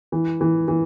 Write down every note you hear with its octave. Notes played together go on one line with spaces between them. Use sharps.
E3
E3
E3